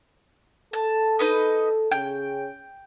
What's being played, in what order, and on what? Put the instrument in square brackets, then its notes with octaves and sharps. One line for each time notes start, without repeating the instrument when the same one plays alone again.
[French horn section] A4 [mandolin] A5
[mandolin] D#4 B4 D#5
[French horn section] C#3 C#4 G#4 [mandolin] G5